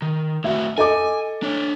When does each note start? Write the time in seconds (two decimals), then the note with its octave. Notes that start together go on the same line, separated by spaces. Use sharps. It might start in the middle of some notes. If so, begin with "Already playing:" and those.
0.02 D#3
0.44 A2 F#4 E5
0.78 A4 D#5 G#5 D6
1.43 D4 C#5